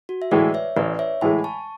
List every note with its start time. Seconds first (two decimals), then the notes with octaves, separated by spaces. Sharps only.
0.09 F#4
0.22 E5
0.31 A2 E3 G#3 B4 D5
0.54 C#5 E5
0.76 A1 B4 D5
0.99 C#5 E5
1.21 A2 E3 G#3 G#5 B5
1.44 A5 C#6